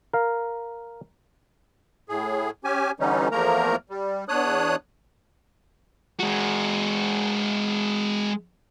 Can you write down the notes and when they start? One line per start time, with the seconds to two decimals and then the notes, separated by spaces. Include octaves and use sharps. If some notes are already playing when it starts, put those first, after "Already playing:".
0.13 A#4 F5
2.09 A2 G#4
2.64 C#4 G4 G#5
3.00 D3 E3 G3 C#4 D#4
3.31 E2 F3 A3 A#3 A#4 A#5
3.90 G3
4.29 E2 D4 C#5 D#6 F#6
6.20 G#3 F#4